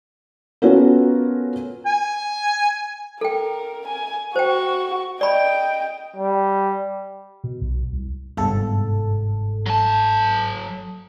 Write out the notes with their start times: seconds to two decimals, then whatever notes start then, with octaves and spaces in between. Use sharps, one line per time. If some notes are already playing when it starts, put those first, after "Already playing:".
0.62 B3 C#4 F4 F#4 A4 A#4
1.85 G#5
3.21 A4 A#4 G5
3.87 G#5
4.36 F#4 C5 G5 C#6
5.21 D5 D#5 G5 B5
6.16 G3
7.44 B2
7.61 B1
7.92 C2
8.37 G1 G#2 C3 A4
9.66 F#3 A5